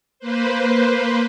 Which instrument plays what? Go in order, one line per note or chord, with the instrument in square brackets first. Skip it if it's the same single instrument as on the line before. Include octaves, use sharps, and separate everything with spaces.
[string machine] A#3 B4 C5